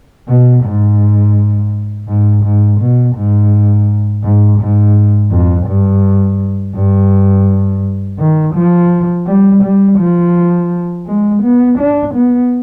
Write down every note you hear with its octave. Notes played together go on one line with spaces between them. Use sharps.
B2
G#2
G#2
G#2
B2
G#2
G#2
G#2
F2
G2
G2
D#3
F3
G3
G3
F3
G#3
B3
D4
B3